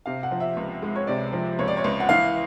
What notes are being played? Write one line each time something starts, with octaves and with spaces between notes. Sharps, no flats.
C3 F5
F#5
F3
E5
C#2
G#3
C#5
C3 D5
F3
C#2 C#5
D5
C#5
C#2
F#5
E3 F5